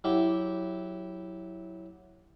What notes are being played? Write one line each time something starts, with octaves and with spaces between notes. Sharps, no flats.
F#3 E4 G4